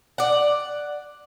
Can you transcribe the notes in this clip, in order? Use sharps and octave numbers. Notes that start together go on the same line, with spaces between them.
D5 F#5